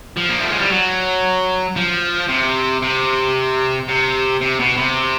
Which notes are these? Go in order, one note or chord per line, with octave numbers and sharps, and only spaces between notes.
F3
A#3
A3
G#3
G3
F#3
F3
C3
C3
C3
C3
B2
C3